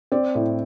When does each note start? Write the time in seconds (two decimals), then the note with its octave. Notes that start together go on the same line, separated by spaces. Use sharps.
0.12 C4 D5
0.35 A2